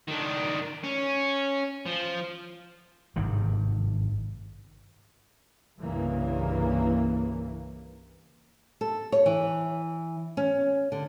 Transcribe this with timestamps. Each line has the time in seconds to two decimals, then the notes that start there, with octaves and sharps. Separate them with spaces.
0.08 D#3 D4
0.83 C#4
1.86 F3
3.16 G#1 G2 C3 D#3
5.78 C2 G2 C#3 E3 A#3
8.81 A4
9.12 C#5
9.26 E3
10.37 C#4
10.92 D3